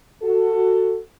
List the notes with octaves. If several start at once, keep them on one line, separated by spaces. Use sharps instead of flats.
F#4 A4